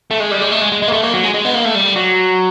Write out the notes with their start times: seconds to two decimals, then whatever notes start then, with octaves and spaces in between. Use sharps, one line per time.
0.11 A3
0.20 G#3
0.31 G3
0.42 G#3
0.52 A3
0.61 G#3
0.72 G#3
0.82 G#3
0.88 A#3
0.92 A3
1.03 A#3
1.13 F#3
1.24 G#3
1.34 G#3
1.45 B3
1.54 A#3
1.65 A3
1.75 G3
1.96 F#3